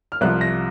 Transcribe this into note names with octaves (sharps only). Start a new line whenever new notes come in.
F6
C2 C3 F3 F#6
A#6